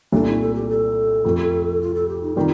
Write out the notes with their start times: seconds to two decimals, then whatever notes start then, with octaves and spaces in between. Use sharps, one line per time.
0.12 C2 A#2 A3 D4
0.27 D#4
0.41 A4
0.55 G4
0.69 A4
1.25 F2 C3 F3 A3
1.81 F4
1.95 A4
2.09 G4
2.22 D#4
2.36 C3 D#3 G3 F4